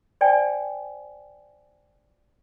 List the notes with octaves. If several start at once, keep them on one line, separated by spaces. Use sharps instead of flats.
C5 D5 G5 G#5